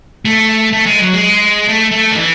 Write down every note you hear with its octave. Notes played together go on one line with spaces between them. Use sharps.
A3
A3
G#3
F#3
G#3
A3
A3
D#3
E3